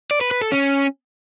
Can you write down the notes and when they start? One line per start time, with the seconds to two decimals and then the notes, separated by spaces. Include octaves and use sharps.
0.11 D5
0.21 B4
0.31 B4
0.42 A4
0.52 C#4